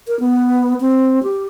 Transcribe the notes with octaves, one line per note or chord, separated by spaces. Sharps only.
A#4
B3
C4
G4